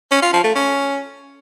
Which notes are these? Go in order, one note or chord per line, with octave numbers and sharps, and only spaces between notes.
C#4
F4
F3
A3
C#4